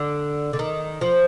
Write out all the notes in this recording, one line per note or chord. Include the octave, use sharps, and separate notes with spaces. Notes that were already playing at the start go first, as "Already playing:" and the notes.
Already playing: D3
D3
D#3
F3